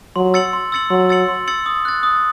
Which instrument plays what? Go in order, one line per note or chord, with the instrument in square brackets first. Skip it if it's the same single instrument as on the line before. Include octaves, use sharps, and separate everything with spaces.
[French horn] F#3 [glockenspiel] C6
[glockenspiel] E6 A6 C#7 F#7
C6
E6 A6 C#7 F#7
[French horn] F#3 [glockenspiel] C6
[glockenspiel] E6 A6 C#7 F#7
C6
E6 A6 C#7 F#7
D#6
F#6 A6
D#6